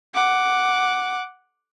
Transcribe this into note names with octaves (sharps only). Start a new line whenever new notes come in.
F#5 D6